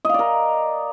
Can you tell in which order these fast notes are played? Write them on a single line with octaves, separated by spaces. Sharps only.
D#5 F5 D5 A#4